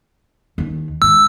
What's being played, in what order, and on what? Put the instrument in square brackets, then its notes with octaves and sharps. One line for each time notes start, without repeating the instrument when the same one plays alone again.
[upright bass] D#2 D#3
[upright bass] G#2 D#3 [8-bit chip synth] E6